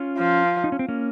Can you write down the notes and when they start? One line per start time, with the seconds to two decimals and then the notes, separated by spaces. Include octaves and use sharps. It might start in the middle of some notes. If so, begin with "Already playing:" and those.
Already playing: C#4 F4
0.17 F3
0.64 D#4
0.72 C#4
0.79 C4
0.89 A#3 C#4